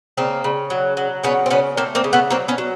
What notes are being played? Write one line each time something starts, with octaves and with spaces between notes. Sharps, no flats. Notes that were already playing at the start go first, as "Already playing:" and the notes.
C#3 A#3 C4
C#3
F#3
F#3
C#3 B3 C#4
C4
C#3 B3 C#4
A3 A#3 C4
A#3 C4
C#3
A3 B3
F#3 A#3 C4
B3 C#4
F#3